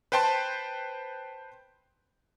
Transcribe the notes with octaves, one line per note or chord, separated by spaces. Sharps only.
B4 C5 G5 A5 C6